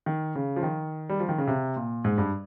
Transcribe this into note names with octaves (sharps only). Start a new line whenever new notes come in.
D#3
C#3
F3
D#3
G3
F3
D#3
C#3
C3
A#2
G#2
G2